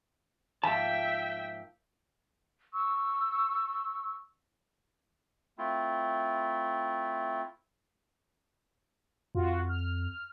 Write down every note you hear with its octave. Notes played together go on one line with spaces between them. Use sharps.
G#2 F3 A#3 E5 G5 A5
C#6 E6
A3 C4 E4 F4
F2 F4 F#4
F6